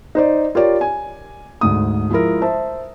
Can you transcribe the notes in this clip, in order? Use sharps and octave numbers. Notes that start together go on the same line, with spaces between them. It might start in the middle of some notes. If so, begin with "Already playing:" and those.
D#4 C5 D5
F4 G4 A#4 C#5 D5
G#5
D2 G#2 D#6
F3 G#3 E4 A#4
C5 E5 A5